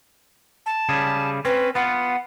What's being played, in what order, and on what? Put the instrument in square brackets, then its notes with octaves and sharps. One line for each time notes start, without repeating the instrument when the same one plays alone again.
[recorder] A5
[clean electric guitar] C#3 G3 G#4
[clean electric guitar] C4 C#4 [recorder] B4
[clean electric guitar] B3 F4 [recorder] F#5